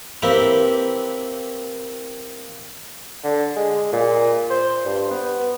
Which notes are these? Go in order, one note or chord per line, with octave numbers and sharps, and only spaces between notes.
A#3 C4 E4 G4 B4
D3
G#3
A#2
C5
G2
B3